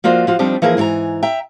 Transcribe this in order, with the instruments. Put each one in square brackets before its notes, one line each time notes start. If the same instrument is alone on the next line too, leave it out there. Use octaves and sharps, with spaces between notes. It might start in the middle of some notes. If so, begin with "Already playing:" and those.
[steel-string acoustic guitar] F3 A#3 F4 F#4 D5 E5
F3 F4 F#4
F3 G3 C4 D4 D#4 G4
E3 F3 A#3 G#4 A#4
G#2 E3 A#4 G#5 A#5
E5 G5 A#5